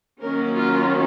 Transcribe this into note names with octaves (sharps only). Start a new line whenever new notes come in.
D#3 F#3 A#3 C#4 A#4
F4